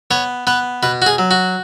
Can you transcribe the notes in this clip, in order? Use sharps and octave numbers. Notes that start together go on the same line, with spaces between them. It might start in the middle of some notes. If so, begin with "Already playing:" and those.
B3 C#5
B3 B4
B2 B4
F#4
G#4
F#3
F#4